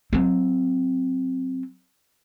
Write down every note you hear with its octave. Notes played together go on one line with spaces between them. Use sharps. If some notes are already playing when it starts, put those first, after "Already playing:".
F#3 C4